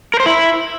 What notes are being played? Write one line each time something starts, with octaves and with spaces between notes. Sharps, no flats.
A#4
C5
E4